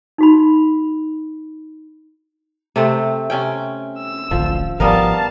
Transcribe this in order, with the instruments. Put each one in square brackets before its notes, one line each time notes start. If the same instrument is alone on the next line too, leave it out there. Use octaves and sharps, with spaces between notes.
[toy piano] D#4 F#4 B5
[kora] C3 A3 C4
C3 C#4 G5
[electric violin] E6
[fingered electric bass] D1 A1 D2 [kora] F3
[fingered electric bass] G#1 F3 [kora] G3 B3 A#4 [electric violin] F5 A5